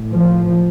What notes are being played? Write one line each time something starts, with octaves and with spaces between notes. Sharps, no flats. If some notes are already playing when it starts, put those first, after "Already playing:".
Already playing: A2
F3